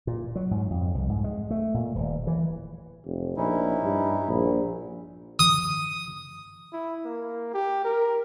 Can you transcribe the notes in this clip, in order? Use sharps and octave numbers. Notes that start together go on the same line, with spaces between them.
A#2
F#3
G#2
F2
C2
G#2
G#3
A3
A#2
D#1
E3
F1
A#1 C#4 D#4 E4
G2
A#1
D#6
E4
A#3
G4
A#4